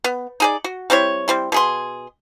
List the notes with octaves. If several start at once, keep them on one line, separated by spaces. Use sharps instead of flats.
B3
D#4 G#4 D5
F#4
G3 C4 E4 C#5
G3 C4 E4
B2 G#4 C6